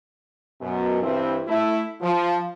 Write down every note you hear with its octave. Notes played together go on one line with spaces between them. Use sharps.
F#2 B2
G2 E3 C4 E4
A3 E4
F3